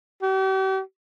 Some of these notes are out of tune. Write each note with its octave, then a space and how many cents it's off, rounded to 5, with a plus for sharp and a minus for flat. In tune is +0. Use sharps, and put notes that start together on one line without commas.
G4 -40